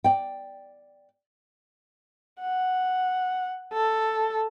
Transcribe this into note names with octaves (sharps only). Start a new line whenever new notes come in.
D5 G5
F#5
A4